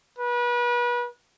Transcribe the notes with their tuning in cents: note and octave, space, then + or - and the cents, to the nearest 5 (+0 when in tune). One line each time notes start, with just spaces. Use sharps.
B4 -35